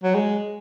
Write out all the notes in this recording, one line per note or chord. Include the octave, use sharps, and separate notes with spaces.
F#3
G#3